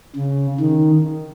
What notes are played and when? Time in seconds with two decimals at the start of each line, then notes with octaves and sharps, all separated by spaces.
0.16 C#3
0.60 D#3